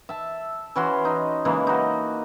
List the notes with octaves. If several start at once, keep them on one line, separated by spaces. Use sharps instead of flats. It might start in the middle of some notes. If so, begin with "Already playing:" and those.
E5 A5
E3 C#4 F#4 C6
D#4
C#3 E3 G#3 A#3
D#4 F#4